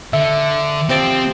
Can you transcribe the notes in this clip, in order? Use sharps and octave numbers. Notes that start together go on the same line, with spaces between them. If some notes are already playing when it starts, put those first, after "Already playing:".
D3 E5
C3 F3 C4 D5